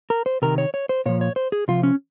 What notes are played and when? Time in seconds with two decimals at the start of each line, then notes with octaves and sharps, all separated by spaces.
0.10 A#4
0.26 C5
0.42 C3 D#3 A#4
0.58 C#5
0.74 C#5
0.89 C5
1.06 A#2 F3 C#5
1.21 C#5
1.36 C5
1.52 G#4
1.68 C3 F3 F4
1.83 C#4